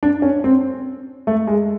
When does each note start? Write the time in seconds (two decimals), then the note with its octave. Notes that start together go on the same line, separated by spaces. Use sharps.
0.03 D4
0.22 C#4
0.44 C4
1.27 A3
1.47 G#3